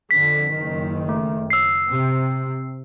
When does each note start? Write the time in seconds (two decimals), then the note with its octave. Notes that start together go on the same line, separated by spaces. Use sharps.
0.11 F2 D3 B6
0.55 F#1 D#3
1.09 A3
1.50 E6 C7
1.90 C3